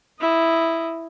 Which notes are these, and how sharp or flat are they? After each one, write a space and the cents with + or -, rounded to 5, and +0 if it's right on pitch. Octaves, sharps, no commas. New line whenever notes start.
E4 +0 D#5 +0